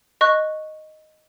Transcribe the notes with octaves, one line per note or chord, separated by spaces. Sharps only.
D#5 C#6 F#6